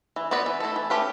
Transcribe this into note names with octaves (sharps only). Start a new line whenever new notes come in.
E3
B3 F#4 B4 D5
E3
A3 E4 A4
E3
A3 C#4 G4 B4